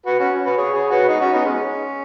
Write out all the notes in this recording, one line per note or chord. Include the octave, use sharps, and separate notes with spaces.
F#4 B4
C#4 F#4
F#4 B4
G#4 C#5
G#4 C#5
F#4 B4
D#4 G#4
C#4 F#4
B3 D#4
G#3 C#4